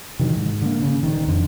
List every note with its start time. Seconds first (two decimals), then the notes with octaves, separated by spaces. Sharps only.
0.19 C3 D#3 E3 F#3
0.36 G#2
0.62 D3 A#3
0.82 C#3
1.03 D#1 D#3
1.28 F2 D3